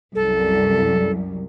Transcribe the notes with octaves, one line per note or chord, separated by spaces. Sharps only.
C2 F#2 A4